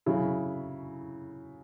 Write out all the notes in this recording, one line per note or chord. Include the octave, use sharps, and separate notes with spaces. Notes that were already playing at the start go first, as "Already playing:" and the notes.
C#3 F#3 E4